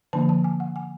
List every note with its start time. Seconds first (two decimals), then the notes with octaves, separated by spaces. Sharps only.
0.13 D3 F3 A#3 D4 A5
0.29 A5
0.44 G#5
0.60 F#5
0.76 G#5